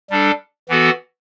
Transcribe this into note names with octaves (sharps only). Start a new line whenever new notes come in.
G3 D4 A4
E3 B3 F#4 A4